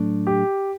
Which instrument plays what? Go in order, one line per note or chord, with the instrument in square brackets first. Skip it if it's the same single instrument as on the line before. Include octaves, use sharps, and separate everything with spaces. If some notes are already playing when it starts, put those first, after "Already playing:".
Already playing: [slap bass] A2 F#3 A3 D4
[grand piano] G4